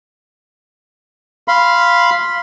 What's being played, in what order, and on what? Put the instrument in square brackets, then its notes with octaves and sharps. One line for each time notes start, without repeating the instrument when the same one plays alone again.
[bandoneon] F5 B5 C6